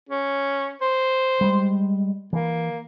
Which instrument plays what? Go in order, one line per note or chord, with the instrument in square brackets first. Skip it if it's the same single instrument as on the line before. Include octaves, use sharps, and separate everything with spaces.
[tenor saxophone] C#4
C5
[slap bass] G3 G#3
[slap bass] E3 [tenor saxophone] A#3